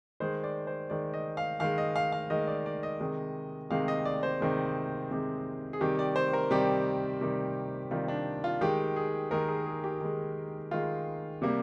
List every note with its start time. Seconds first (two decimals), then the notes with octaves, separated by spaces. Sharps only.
0.20 D#3 G#3 C5
0.44 D5
0.67 C5
0.90 D#3 G#3 D5
1.14 D#5
1.37 F5
1.60 D#3 G#3 F5
1.78 D#5
1.96 F5
2.12 F5
2.30 D#3 G#3 D#5
2.47 D5
2.66 D5
2.83 D#5
3.00 C3 D#3 G#3
3.70 C3 D#3 G#3 F5
3.88 D#5
4.05 D5
4.23 C5
4.40 C3 D#3 G#3
5.11 C3 D#3 G#3
5.73 G#4
5.81 C3 D#3 G3 G4
5.99 D5
6.16 C5
6.33 A#4
6.51 C3 D#3 G3 G4
7.21 C3 D#3 G3
7.91 C3 D#3 G3 F4
8.08 D4
8.44 F4
8.61 D#3 G#3 G4
8.96 G#4
9.31 D#3 G#3 A#4
9.48 G#4
9.66 G#4
9.84 G4
10.01 D#3 G#3
10.71 D#3 G#3 F4
11.42 C3 G3 A#3